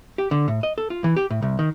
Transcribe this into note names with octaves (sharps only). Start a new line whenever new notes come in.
G4
D3
A2
D#5
A4
F4
E3
G4
A2
C2
D#3